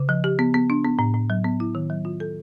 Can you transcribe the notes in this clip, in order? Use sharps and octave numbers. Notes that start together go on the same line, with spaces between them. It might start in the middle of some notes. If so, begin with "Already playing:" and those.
Already playing: C#3
F3
G4
B3
B3
D4
B3
A2
A2
F#3
B3
E4
D#3
F#3
F4
A4